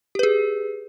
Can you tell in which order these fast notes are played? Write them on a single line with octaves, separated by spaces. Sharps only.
G4 B4 G#4